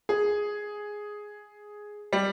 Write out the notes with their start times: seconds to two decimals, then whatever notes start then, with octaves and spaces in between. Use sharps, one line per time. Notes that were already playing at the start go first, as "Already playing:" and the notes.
0.09 G#4
2.13 G3